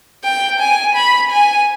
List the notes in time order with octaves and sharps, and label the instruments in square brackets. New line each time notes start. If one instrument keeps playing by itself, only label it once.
[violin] G5
G#5
B5
G#5